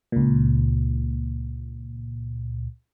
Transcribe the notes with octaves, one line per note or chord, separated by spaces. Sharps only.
C#2 A#2